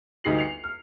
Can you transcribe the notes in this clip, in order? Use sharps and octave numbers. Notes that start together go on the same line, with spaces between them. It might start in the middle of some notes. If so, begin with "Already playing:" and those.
G1 D2 D#4 G4 C7 F#7
C7 C#7 F7
F6